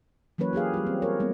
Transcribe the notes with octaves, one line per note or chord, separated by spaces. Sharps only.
E3 F#3 A#3 C#4 B4 C#5
A#3 G4 G#4 F5
G3 F4
C4
A#4 C#5
G3 A3 B3 C4